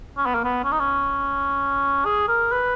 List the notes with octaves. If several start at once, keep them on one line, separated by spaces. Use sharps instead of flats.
C#4
B3
A#3
B3
C#4
D#4
C#4
G#4
A#4
B4